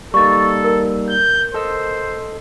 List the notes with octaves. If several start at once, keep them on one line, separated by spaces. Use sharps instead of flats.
G3 A#3 D#4 A4 C#6 A6
A#4
G6
A4 C5 D#5 E6